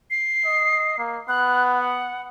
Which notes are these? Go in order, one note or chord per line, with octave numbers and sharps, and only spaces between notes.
C7
D#5
A#3
B3 F#6
F#5